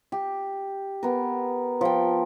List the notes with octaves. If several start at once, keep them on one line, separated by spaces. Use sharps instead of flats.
G4
B3 A#4
F3 G5